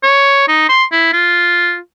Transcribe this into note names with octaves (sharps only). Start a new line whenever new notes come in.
C#5
D#4
C6
E4
F4